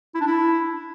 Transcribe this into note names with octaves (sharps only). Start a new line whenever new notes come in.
E4
D4
E4